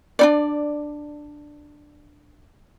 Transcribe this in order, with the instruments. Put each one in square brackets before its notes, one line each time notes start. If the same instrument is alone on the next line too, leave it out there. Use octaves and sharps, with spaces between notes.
[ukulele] D4 D#4 D5